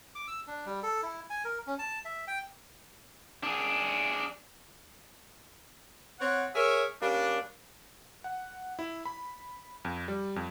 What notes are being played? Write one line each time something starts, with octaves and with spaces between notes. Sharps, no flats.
D6
E6
D4
G3
A4
E4
G#5
A#4
C#4
A5
E5
G5
D4 G#4
C4 C#5 F#5
G#4 A#4 C#5 E5
G3 A#3 C#4 D4
F#5
E4
B5
F2
G3
F2